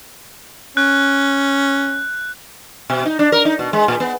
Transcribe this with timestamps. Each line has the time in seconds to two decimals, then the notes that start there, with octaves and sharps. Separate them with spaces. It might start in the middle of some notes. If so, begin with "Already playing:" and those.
0.77 C#4 F#6
2.90 B2
3.05 D#4
3.19 D4
3.32 A#4
3.45 D#4
3.59 B2
3.73 G#3
3.88 A#2
4.00 B3